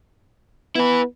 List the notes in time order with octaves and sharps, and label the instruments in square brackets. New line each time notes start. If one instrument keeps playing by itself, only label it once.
[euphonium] B3 [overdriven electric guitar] E4 B4